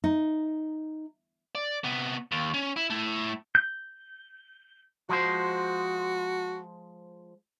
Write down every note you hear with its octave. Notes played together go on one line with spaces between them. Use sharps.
D#4
D5
C3 B3
D#2
C#4
E4
A3 E4
G6
F3 G#3 F#4 C5